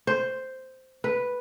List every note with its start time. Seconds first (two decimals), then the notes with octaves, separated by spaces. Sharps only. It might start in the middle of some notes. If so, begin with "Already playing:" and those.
0.07 C5
1.04 B4